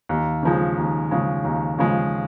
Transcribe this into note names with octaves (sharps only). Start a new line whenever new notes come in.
D#2
C#3 F3 G#3
D#2
C#3 F3 G#3
D#2
C#3 F3 G#3